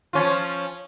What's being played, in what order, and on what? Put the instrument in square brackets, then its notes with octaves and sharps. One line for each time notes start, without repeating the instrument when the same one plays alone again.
[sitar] F3 C#4 F4